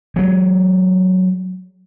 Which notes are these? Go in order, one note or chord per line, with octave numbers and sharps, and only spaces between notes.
F#3 G#3